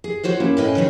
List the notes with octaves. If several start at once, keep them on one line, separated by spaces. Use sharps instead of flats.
G#4
F4 F#4 C5 C#5
A#3 C#4 E4
A2 A3 C#4 B4 D#5 G#5
D2 D#3 F#3 C#4 G#4